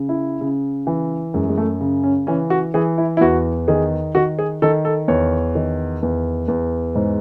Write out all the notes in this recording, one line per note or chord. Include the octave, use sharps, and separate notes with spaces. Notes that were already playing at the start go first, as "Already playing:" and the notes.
Already playing: C#3
E4
C#3
E3
F#2 G#3
G#3
A3
C#3
C#4
E3 C#4
F#4
E3 G#4
E4
E4
E2 F#4
D#3 G#4
D#3 F#4
G#4
D#3 A4
A4
E2 C#5
D#3
E2
E2
G#2 C5